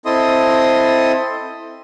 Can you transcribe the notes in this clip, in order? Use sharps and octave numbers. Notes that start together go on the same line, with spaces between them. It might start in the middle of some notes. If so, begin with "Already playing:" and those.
C4 E4 A4 D#5 C6 D#6